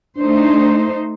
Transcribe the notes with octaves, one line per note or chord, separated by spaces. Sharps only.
A3 D4 D#4 C5